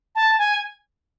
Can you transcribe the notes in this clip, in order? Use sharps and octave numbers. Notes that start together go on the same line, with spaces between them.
A5
G#5